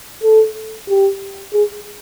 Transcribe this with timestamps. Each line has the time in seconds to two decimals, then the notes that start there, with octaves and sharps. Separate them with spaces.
0.24 A4
0.89 G4
1.53 G#4